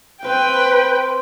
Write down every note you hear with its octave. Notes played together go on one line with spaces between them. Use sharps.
C4 B4 C5 F5 G5